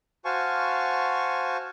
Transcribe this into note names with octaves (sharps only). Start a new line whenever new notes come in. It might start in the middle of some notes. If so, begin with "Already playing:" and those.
F#4 C5 F5 G#5 A5 C#6